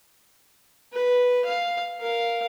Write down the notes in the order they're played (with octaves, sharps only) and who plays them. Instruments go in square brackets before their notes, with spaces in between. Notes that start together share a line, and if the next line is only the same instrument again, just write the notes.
[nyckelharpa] B4
F5
A#4 F5